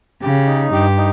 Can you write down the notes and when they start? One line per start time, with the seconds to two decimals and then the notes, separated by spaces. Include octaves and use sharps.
0.22 C#3 G4
0.47 D#4
0.72 G2 G4
0.97 D#4